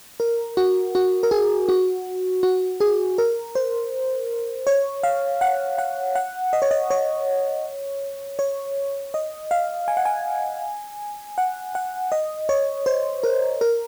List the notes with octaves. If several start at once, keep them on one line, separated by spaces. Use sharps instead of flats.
A#4
F#4
F#4
A#4
G#4
F#4
F#4
G#4
A#4
C5
C#5
F5
F#5
F#5
F#5
D#5
C#5
D#5
C#5
C#5
D#5
F5
G#5
F#5
G#5
F#5
F#5
D#5
C#5
C5
A#4
A#4